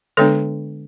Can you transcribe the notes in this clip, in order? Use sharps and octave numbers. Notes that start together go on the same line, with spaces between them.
D3 G#3 B3 D4 A4 C#5